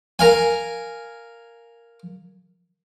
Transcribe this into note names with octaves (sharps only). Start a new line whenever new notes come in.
A#4 F5 G#5